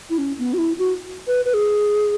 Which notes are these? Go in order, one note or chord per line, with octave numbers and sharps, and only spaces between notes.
E4
C#4
B3
F#4
E4
F#4
B4
B4
G#4